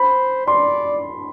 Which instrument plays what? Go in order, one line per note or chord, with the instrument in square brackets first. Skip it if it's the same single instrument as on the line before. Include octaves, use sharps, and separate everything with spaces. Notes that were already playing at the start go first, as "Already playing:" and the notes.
Already playing: [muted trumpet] C5 [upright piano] B5
[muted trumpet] D5 [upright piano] C6